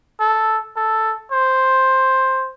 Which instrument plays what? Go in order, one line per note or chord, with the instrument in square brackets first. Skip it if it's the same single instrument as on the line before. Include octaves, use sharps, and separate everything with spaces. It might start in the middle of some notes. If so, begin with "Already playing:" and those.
[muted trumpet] A4
A4
C5